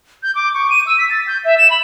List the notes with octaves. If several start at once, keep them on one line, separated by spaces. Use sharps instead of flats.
G6
D6
C#6
D#7
E6
B6
A6
G6
E5
E7
B5